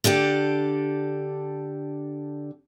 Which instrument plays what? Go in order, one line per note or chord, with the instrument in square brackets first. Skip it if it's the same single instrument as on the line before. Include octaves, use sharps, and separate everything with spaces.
[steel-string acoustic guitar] D3 D4 G4 A4